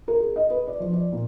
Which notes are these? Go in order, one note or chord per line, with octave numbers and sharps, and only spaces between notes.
A#4
G#4
D#5
B4
D5
F3
D5
A#2